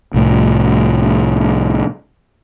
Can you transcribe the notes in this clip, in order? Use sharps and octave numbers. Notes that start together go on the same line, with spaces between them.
C2 A2